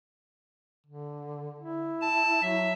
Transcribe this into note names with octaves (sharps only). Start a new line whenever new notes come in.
D3
E4
A5
F#3 E5